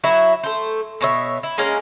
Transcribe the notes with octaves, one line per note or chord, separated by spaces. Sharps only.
F#3 E4 B4 E5
A3 C5
B2 C#5 E5
E4
G#3 A#3 C#4 A#4